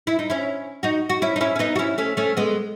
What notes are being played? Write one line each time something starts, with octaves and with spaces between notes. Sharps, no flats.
E4
D#4
C#4 E4
D#4 F#4
F#4
C#4 E4
D#4
C#4 E4
C#4
B3 D#4
F#4
C#4 E4
A3 C#4
A3 C#4
G#3 B3